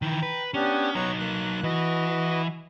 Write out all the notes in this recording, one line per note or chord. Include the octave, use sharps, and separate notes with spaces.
D#3 E3 G5 A#5
B4
B3 C#4 D4 G4
F#3 B3 D#4 C#5 A#5
A#3 F#6
E3 F#4 B4 D#5